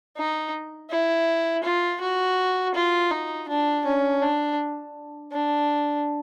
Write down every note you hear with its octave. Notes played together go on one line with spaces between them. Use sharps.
D#4
E4
F4
F#4
F4
D#4
D4
C#4
D4
D4